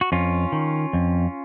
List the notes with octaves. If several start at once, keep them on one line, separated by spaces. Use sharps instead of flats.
F#4
F2 C#4 F4
D#3
F2